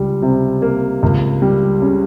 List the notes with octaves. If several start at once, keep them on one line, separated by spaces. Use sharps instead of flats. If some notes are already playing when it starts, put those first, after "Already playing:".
Already playing: C#2 G3
C3
A#3
C#2
G3
C#3